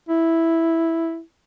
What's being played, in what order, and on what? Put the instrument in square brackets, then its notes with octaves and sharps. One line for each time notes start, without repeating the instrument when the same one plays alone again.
[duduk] E4